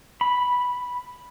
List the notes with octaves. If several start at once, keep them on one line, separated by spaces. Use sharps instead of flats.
B5